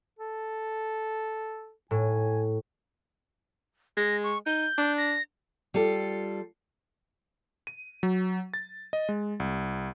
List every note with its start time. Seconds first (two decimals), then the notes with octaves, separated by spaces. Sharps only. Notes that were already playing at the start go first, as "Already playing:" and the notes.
0.19 A4
1.91 A2 G#5
3.97 G#3 A#6
4.24 C#6
4.46 D#4 G6
4.78 D4
4.98 A#6
5.74 G3 F4 A4
7.67 D#7
8.03 F#3
8.54 A6
8.93 D#5
9.09 G#3
9.40 C2